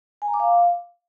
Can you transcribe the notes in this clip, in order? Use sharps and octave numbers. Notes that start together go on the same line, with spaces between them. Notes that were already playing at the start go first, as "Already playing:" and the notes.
G#5
A#5
D6
F5